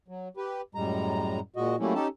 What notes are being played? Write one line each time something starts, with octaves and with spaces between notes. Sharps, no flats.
F#3
G4 B4
F#2 A2 G3 G#3 A#5
A#2 G#3 F#4 D#5
F#3 G3 A3 A#3 C#4 E4
C#4 D#4 G4 A4 A5